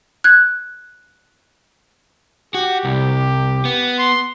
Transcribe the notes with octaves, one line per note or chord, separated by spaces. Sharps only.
F#6 G#6
F#4 G4
C2
B3
C6